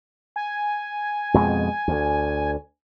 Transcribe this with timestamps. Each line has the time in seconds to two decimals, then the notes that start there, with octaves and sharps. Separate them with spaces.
0.36 G#5
1.34 F2 B2 G#3
1.88 D2